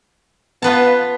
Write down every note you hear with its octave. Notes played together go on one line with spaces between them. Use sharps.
B3 F4 B4 A5